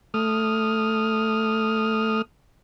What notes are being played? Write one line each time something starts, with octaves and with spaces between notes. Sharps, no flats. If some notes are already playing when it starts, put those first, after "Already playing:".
A3 D#6 F6